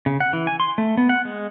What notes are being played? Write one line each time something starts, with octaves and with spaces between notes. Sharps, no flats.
C#3
F#5
E3
G#5
C6
A3
B3
F#5
G#3